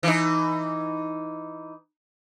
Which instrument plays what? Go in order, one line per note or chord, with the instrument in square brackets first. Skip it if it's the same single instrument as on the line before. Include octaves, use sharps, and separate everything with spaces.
[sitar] E3 D#4